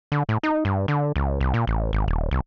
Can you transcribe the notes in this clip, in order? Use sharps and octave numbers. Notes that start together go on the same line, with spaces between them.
D3
A2
D#4
G2
D3
C#2
C2
A#2
A1
G#1
D#1
C2